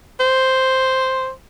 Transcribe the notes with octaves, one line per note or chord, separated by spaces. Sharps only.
C5